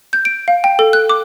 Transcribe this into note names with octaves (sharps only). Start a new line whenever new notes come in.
G6
D7
F5
G5
A4
F#6
D6